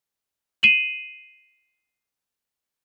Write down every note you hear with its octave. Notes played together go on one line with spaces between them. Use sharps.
C7 D#7 E7 F#7